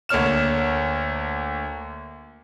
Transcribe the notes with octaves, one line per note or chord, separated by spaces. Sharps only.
D2 A#3 C#5 F6 E7